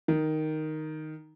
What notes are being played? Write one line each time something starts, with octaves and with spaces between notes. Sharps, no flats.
D#3